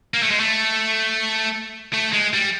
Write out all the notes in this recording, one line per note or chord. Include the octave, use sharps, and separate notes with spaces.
A#3
A3
G#3
A3
A3
G#3
G3